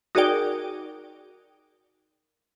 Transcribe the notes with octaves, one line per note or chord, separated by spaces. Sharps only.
D#4 F#4 G#4 A#4 D5 G5